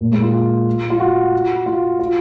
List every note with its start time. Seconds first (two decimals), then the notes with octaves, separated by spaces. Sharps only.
0.01 A#2
0.11 G#3
0.22 F4
0.90 F4
1.00 F#4
1.66 F4
1.99 F4